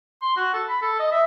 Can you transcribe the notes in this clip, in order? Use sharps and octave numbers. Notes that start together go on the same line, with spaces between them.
C6
F#4
A4
B5
A4
D#5
E5